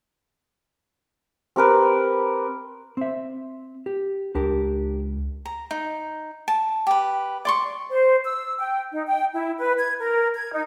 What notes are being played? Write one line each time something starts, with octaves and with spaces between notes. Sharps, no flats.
C4 G4 A#4 B4
C4 E5
G4
C#2 D4 G4 A#4
A#5
D#4
A5
G4 B4
D5 C6 C#6
C5
E6
G5
D#4
G5
E4
B4
G#6
A#4
G#6
D#4